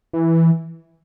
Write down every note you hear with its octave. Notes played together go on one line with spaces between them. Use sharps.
E3